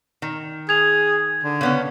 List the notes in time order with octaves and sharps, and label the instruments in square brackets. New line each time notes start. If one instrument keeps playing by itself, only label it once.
[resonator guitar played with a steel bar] D#3
[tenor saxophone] G#4 [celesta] G#6 F7
[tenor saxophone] D3
[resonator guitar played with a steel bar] C#3 B3 C#4